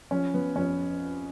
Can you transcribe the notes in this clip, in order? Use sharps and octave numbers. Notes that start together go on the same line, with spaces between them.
F3 C#4
F3 B3
F2 C#4